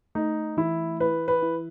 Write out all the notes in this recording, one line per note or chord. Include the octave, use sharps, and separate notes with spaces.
A3 D#4
E3 E4
E4 B4
B4
E4